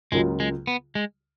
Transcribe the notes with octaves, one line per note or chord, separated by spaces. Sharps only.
C#2 C#3 F#3 G#3 A#3 F4
G#3
B3
G#3